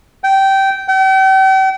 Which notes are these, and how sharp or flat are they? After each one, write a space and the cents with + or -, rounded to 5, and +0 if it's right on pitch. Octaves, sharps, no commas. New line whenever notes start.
G5 -15
G5 -40